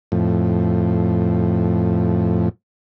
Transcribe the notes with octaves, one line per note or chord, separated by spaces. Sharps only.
F2 A2